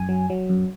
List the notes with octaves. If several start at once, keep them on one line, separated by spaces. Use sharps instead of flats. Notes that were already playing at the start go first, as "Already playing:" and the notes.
Already playing: F#2 G#5
F#3
F#3
F#2